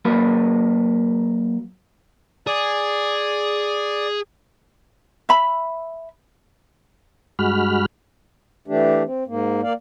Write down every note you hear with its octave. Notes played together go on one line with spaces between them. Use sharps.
F#3 A#3 A#4 B4
G#4 D5
E5 B5
G2 G#3 F#4 B5 F6
E3 A3 D4 G4
C4
G#2 A#3
A#3 D5 F5